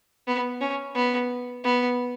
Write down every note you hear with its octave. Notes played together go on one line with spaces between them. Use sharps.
B3
C#4
B3
B3